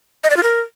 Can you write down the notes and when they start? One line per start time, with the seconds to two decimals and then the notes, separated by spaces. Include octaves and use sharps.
0.24 D#5
0.30 D5
0.37 F4
0.43 A#4